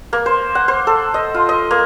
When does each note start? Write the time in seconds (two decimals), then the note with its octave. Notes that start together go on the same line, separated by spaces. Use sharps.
0.13 A#3
0.26 C5
0.55 F#5
0.68 C5
0.87 A4
1.14 D#5
1.34 F4
1.49 D#5
1.71 A#3